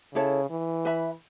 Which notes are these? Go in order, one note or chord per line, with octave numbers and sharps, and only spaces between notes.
C#3 E4 A4 C#5
E3
B4 E5 B5